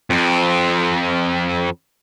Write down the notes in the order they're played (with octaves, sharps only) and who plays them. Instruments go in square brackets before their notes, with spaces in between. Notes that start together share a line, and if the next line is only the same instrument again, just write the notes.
[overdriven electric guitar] F2 C4